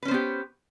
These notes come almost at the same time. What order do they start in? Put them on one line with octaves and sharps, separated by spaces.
B4 C#4 C5 B3 G4